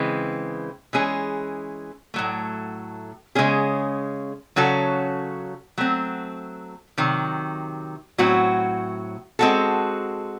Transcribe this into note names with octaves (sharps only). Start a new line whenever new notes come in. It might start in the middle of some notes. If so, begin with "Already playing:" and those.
Already playing: C#3 E3 G#3 C4
E3 G#3 C#4 G#4
A2 F#3 A3
C#3 G#3 C#4 G#4
C#3 F#3 C#4 F#4 A4
F#3 A3 C4
C3 D#3 F#3
A2 F#3 C4 F#4
G#3 C4 F#4 A4